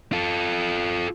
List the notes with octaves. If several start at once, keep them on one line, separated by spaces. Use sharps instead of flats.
F4 A4